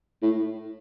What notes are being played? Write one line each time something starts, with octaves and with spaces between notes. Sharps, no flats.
A2